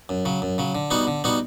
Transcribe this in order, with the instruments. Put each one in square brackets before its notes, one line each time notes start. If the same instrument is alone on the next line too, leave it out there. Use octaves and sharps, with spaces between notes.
[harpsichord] F#2
C#3 F#3
F#2
C#3 F#3
D3
G3 B3 D#4 F#4
D3
G3 B3 D#4 F#4